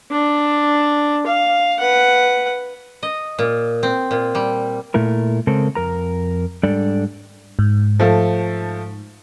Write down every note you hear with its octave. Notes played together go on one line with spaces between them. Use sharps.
D4
F5
B4 F#5
D#5
A#2
C4
A#2
G3
A#2 A3 E4 A#4
C#3 G#3 C4 A4 A#4
F2 A#4 A#5
G#2 G3 D4 A4 D5
G#2
F3 A3 A4